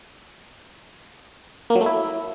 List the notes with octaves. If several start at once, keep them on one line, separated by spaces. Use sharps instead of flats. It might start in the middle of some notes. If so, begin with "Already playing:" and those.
A#3
F#3
A3
E4